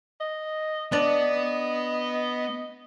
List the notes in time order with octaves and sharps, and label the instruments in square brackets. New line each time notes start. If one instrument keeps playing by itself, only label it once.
[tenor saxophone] D#5
[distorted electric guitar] B3 [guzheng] D4 D5 [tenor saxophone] D#5